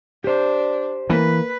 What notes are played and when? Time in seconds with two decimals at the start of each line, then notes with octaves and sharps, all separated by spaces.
0.24 D4 G4 C5
1.10 E3 A#3 B4